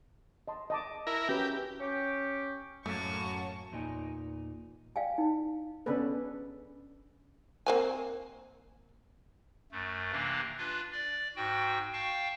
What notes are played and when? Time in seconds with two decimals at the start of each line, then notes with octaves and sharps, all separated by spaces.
0.48 D#5 A5 C6
0.70 D#5 A5 D6
1.07 E4 A#4
1.29 C#4 F#4 G4 B4
1.79 C#4 G4
2.86 F#2 A2 A3 A#3 A5 C#6
3.72 E2 A#2 D#4 G#5
4.96 D5 F5 G5 G#5
5.18 D#4
5.86 C#3 B3 C#4 D4 A4 B4
7.66 A#3 C4 G#5
9.72 F#2 A3
10.12 C3 E3 A#3 D4
10.58 D4 F4 B4
10.92 D5
11.36 G#2 F#4 G5
11.93 F5 G5 A5 C#6